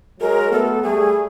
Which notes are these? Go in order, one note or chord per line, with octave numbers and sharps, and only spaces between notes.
F#3 G#3 A#4
A3 B3 A4
G3 A3 G#4